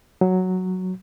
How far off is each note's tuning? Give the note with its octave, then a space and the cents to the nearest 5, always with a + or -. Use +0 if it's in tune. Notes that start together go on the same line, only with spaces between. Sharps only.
F#3 +0